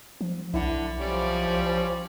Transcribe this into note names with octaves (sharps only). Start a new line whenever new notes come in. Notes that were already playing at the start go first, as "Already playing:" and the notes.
F3
B1 D3 E4 F#5
F3 G3 C#4 D5